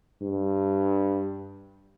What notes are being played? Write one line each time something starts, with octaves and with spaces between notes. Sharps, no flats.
G2